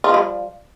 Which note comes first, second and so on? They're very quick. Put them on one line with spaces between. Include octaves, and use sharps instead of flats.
F4 F3 G3